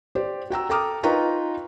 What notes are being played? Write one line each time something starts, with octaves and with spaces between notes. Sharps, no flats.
G4 C5 D5
F#4 G5 A#5 E6
A4 G5 A#5 D6 D#6 F6
D#4 F4 B4 G5 A#5 C#6